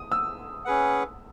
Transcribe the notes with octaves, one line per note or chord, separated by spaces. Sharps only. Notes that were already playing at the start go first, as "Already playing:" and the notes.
Already playing: D#6
E6
C#4 G#4 B4 F#5